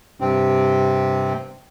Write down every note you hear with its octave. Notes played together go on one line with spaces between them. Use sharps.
G2 C3 C4